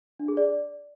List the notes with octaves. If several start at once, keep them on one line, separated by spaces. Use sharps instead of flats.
D4
G#4
D5